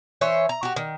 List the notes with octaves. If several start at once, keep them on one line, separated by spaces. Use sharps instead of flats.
E3 C5 C#5 E5
A#5
F#4 G4
D#3